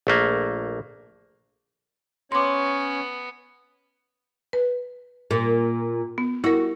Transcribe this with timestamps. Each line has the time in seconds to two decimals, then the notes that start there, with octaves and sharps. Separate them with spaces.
0.07 A#1 A3 A#3
2.32 B3 C#4 C#5 C6 D6
4.53 B4
5.31 A#2
6.18 B3
6.44 E4 F#4 A#4